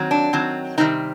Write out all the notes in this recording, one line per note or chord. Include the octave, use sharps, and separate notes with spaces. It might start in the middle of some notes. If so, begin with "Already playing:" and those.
Already playing: D#3 F#3 C4
D4
D#3 F#3 C4
C3 D#3 G3 C4 D#4